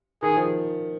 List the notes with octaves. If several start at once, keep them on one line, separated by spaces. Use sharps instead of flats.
D#3 G#4
F3